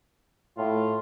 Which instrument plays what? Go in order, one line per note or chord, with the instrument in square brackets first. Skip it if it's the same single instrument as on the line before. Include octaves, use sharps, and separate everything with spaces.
[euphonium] A2 [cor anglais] F4